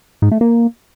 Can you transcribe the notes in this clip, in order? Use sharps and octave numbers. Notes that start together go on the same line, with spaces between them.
G#2
A3
A#3